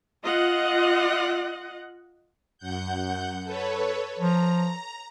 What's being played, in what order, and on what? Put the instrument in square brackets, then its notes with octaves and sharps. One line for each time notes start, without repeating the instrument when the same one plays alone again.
[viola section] F4 D#5 F#5
[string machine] F#2 F#5 G6
A4 B4 C#5
[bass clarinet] F3 [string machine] A#5